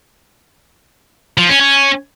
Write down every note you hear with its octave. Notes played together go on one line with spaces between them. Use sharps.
F3
C#4
C#4